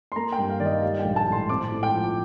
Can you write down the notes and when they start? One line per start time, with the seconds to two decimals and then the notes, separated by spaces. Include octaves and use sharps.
0.12 C6
0.16 A#3 A#5
0.32 G5
0.38 G2
0.49 F5
0.60 D#3 D5
0.66 D#5
0.82 G3 F5
0.99 G5
1.05 A#1
1.16 A5
1.27 A2 C6
1.49 C4 D6
1.72 A2
1.83 G5
1.94 F3